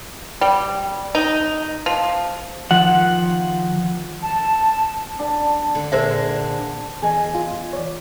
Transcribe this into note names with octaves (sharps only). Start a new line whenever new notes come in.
G3
D#4
F3
D#3 F3 F#5
A5
D4 A5
D3
A#2 D3 G#4 A#4 C5 E5
E2 G#4 D#5
F4
C#5 D5